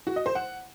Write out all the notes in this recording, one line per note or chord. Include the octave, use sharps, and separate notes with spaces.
F#4
D#5
C5
F#5